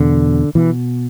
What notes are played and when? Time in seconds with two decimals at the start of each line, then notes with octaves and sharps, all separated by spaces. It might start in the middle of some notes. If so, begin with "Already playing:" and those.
Already playing: E2 B2 D3
0.55 B2 E3